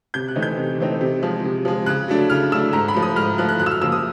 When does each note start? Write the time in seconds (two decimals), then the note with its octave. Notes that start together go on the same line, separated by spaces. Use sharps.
0.14 C3 G6
0.28 F#6
0.36 E3 A3 C4 D#4
0.42 G6
0.58 C3
0.78 E3 A3 C4 D#4
1.01 C3
1.22 F3 G#3
1.44 C3
1.65 F3 G#3
1.86 C#3 F#6
2.08 F#3 A3 D4
2.30 C#3 F6
2.52 F#3 A3 D4 E6
2.73 G#2 A#5
2.88 B5
2.95 F3 A3
3.02 D#6
3.16 G#2 F6
3.38 F3 A3 F#6
3.49 F#6
3.59 F#2 F#6
3.66 E6
3.71 F6
3.81 C#3 F3 A#3 E6
3.92 D#6